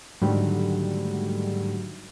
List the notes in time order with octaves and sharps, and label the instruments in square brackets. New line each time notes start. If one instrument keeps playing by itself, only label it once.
[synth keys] G#2 D3 D#3 F#3 G3 A3